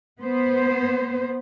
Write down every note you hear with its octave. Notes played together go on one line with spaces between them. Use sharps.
B3 C5